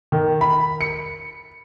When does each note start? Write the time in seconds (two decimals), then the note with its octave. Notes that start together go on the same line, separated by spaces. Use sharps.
0.12 D#3
0.41 B5
0.81 C#7